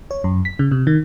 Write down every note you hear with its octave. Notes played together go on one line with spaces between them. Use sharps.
C#5
F#2
B6
C#3
C3
D#3